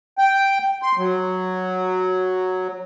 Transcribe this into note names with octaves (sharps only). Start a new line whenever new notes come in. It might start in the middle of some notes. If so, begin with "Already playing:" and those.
G5
C6
F#3